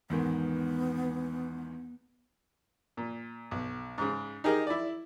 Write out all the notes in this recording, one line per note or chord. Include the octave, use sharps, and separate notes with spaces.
E2 G#2 D#3 B3
A#2
B1
G#2 C#3
D#4 G4 G#4 A#4 D#5
E4 D5